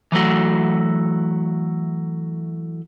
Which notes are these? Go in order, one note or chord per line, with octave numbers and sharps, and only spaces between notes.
E3 F#3 A3 F#4